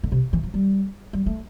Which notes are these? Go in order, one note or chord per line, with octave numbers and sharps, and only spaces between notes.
D3
C3
E3
F3
G3
G3
A3